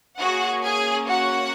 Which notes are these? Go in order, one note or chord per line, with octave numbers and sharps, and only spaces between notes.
A#3 C#4 F#4 G#4 F#5
G#4 G#5
F#4 F#5